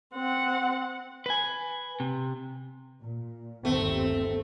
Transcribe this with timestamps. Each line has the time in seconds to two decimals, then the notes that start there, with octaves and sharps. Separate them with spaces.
0.15 C4 F#5
1.26 B4 G#5
2.00 C3
3.01 A#2
3.65 G1 D#2 A3 C4